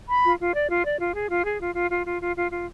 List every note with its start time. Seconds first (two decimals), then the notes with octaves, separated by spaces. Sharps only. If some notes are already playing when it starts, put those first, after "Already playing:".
0.09 B5
0.24 F4
0.39 F4
0.55 D5
0.69 F4
0.84 D5
1.00 F4
1.15 G#4
1.30 F4
1.45 G#4
1.60 F4
1.75 F4
1.90 F4
2.05 F4
2.21 F4
2.36 F4
2.51 F4